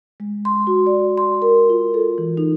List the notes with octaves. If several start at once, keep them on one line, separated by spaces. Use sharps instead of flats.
G#3
C6
F#4
D5
C6
A#4
F4
A4
E3
D#4